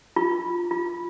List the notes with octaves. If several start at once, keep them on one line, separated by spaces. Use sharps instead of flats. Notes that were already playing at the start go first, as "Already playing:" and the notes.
F4
F4